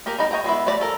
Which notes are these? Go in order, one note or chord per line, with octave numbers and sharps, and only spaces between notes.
A#3 G4 G#4 A#4
G3 B3 D#4
C#5 D#5 F#5 G5 A#5
G3 G#3 B3 E4
G3 A3 B4 D5 A#5
F3 A4 A#4